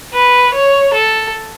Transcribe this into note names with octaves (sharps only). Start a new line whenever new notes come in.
B4
C#5
A4